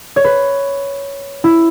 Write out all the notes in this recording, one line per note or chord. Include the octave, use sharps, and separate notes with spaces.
C#5
B4
E4